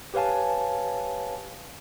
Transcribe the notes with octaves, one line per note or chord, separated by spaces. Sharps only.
G4 B4 C#5 F5 G#5 A5